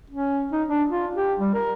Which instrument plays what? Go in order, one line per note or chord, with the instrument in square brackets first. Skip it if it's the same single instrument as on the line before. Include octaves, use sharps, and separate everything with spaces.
[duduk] C#4
D#4
D4
F4
G4
G3
A#4